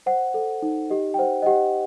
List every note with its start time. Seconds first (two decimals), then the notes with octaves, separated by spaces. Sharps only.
0.06 C5 F#5
0.34 A4
0.62 D#4
0.90 G4 D#5
1.14 G5
1.19 C5 F#5
1.42 D#5
1.46 G4 F#5